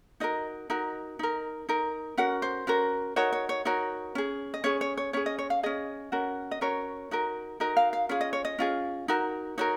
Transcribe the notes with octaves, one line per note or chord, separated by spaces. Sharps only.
D#4 F#4 A#4 D#5
D#4 F#4 A#4
D#4 A#4
D#4 A#4
C#4 F#4 A#4 F#5
C5
C#4 F#4 A#4
D#4 F#4 A#4 C#5
C#5
C#5
D#4 F#4 A#4 C#5
C#4 G#4
D#5
C#4 G#4 C#5
C#5
C#5
C#4 G#4 C#5
D#5
C#5
F5
C#4 G#4 D#5
C#4 F#4 A#4
D#5
C#4 F#4 A#4 C#5
D#4 F#4 A#4
D#4 F#4 A#4 D#5
F5
F5
C#4 F4 G#4 F5
D#5
C#5
D#5
C#4 F4 G#4
D#4 F#4 A#4
D#4 F#4 A#4 C#5